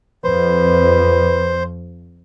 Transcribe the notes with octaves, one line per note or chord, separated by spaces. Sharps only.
F2 B4 C5